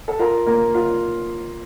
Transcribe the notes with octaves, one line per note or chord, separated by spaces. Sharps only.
A4
F4 A#4
A#3
F4